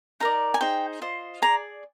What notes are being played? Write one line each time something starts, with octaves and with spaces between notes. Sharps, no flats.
D#4 A#4 D5 A#5
G#5
D#4 G#4 C5 G5
F4 C5 D#5
G#4 D5 A#5